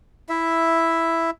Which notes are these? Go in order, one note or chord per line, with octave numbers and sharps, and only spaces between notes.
E4 E5